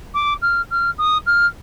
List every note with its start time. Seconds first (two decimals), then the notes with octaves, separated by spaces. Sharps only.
0.14 D6
0.42 F6
0.71 F6
0.98 D#6
1.26 F6